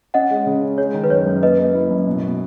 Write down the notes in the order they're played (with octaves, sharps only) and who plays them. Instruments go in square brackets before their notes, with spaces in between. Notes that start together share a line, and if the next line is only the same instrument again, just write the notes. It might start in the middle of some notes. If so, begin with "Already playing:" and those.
[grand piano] C#4 [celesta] D#5 F#5
[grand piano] G#3
C#3
C#4
[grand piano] G#3 [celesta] C#5
[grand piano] D#3
[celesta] B4
[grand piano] F#2 [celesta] C#5
[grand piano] F#2
[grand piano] A#3 [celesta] B4 D#5
[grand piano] A#3
E4
F#2
B2
B2